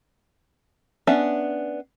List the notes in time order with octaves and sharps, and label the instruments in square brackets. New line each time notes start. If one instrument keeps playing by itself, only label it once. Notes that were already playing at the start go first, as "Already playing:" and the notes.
[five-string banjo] B3 C#4 D4 E5